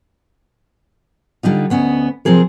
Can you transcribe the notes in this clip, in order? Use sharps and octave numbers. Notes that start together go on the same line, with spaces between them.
D3 G3 D#4 F4
D2 B3 C#4 D#5
C3 F3 C4 G#4 A#4